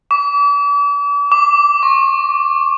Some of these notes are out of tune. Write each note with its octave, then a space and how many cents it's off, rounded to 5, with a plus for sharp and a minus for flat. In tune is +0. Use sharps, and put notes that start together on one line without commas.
D6 -40
D6 -15
C#6 -35